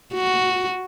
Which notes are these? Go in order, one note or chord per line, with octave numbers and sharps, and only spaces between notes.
F#4